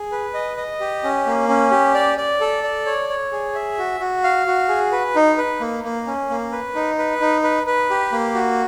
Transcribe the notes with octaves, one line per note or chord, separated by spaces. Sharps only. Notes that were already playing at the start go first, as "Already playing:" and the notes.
Already playing: G#4
B4
D#5
D#5
G4
C#4
A#3
C#4
G4
D5
D5
A4
D5
C#5
C#5
G#4
E5
F#4
F#4
F5
F#4
G#4
B4
D#4
B4
A#3
A#3
C#4
A#3
B4
D#4
B4
D#4
B4
B4
G4
A#3
F#4